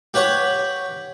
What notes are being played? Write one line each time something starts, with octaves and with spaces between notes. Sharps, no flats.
G4 B4 C#5 F#5